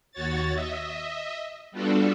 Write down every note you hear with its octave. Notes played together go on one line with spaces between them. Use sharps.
D#2 F#4 C#5 A6
D#5 E5
G3 B3 D4 F4 F#4 A4